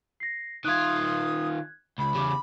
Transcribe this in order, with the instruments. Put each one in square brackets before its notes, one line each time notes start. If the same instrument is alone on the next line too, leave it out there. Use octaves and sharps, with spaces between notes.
[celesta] A#6 C7
[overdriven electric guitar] D#3 F4 [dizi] D#6 [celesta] F#6 G#6
[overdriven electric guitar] C#2 [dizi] B5
[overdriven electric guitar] E2 C#3 [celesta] G4 D6